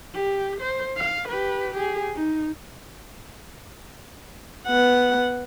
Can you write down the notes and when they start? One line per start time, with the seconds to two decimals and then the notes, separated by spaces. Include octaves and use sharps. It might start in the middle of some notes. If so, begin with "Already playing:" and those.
0.14 G4
0.61 C5
0.97 F5
1.28 G4 B4
1.74 G4 G#4
2.15 D#4
4.66 B3 F#5